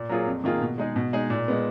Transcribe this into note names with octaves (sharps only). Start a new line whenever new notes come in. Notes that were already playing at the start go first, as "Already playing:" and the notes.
Already playing: A#2
F#3 A#3 F4 G#4
F2
D#3 A#3 F4 G#4
B2
G#3 D#4 G#4
B2
G#3 D#4 G#4
A#2
G#3 B3